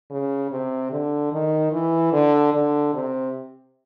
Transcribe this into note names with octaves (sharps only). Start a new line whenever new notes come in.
C#3
C3
D3
D#3
E3
D3
D3
C3